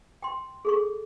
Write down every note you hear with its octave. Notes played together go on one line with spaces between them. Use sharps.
G5 C6
G#4 A4 C#6